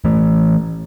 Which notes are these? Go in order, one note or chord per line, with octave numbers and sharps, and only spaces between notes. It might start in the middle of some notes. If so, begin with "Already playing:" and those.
E3 A3